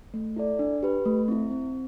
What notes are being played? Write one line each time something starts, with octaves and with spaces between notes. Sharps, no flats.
A3
E4 A4 D5
D4
G4 B4
A3
C4 E4
C4